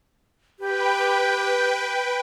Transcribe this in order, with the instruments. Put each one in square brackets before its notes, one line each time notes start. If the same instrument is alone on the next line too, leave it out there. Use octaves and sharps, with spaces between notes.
[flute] G4 [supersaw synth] B4 G5